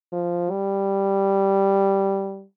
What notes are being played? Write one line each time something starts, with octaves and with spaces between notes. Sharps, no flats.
F3
G3